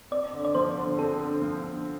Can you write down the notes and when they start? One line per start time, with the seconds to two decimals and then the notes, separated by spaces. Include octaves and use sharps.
0.11 C4 D5
0.33 D3
0.45 D5
0.55 F3 C5
0.76 D3
0.98 C4 A4
1.21 D3
1.42 F3
1.65 D3